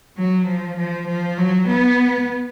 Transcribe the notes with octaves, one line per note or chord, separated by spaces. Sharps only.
F#3
F3
F3
F3
F#3
B3